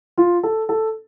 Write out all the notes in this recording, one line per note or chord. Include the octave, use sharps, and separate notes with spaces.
F4
A4
A4